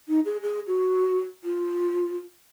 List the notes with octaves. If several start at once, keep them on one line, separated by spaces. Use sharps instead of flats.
D#4
G#4
G#4
F#4
F4